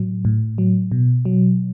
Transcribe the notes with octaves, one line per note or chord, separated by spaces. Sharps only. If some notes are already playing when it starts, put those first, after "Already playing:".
Already playing: A2 F#3
A2
F#3
B2
F#3